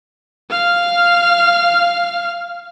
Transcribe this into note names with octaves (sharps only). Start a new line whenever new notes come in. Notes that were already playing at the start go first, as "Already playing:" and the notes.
F5 F6